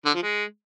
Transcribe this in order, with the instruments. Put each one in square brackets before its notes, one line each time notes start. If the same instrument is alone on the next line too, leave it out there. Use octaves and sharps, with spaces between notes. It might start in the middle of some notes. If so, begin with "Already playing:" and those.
[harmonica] D3
F3
G#3